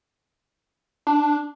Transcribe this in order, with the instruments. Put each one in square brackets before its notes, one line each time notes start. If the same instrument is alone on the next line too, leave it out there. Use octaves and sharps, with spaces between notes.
[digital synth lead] D4